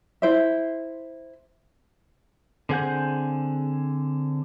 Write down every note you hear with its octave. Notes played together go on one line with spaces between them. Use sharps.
E4 C5 E5
D3 C4 G#4 F#5 G6